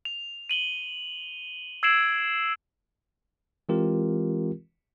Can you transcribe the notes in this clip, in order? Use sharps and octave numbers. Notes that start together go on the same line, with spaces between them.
F7
D#7 F#7 G7
E6 G#6 C7 D7 E7 F#7
E3 G#3 C4 F4 G4 A#4